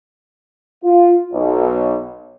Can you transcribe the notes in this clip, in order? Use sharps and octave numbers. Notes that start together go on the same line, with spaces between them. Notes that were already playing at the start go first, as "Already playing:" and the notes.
F4
B1